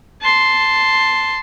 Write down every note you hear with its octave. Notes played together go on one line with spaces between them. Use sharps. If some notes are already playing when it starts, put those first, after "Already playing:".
A5 C6